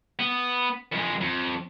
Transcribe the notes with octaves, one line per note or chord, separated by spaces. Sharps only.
B3
F2 G#3
F2